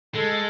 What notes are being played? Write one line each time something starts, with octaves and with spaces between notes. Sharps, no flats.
G#3 A4